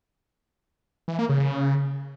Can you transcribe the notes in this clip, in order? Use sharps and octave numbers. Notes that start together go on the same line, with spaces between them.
E3
A#3
C#3
C#3